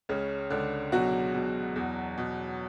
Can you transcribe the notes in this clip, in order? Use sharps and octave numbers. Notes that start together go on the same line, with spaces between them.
C#2 C#3 C#4
C#2 D3 D4
B2 F#3 F#4
B2
E2
B2